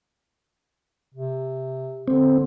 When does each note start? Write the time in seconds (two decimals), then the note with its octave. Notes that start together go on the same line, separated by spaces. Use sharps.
1.15 C3
2.08 D3 C4